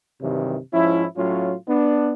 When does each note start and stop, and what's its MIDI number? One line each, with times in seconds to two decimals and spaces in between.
0.21 0.57 43
0.21 0.57 48
0.21 0.57 51
0.21 0.57 52
0.21 0.57 54
0.73 1.04 44
0.73 1.04 53
0.73 1.04 61
0.73 1.04 64
1.17 1.54 45
1.17 1.54 54
1.17 1.54 61
1.17 1.54 65
1.68 2.14 59
1.68 2.14 62